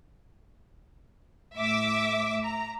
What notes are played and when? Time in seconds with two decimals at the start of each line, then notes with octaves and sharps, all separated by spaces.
1.56 A2 E5 D6
2.44 A#5